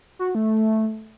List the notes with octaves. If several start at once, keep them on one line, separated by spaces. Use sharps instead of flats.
F#4
A3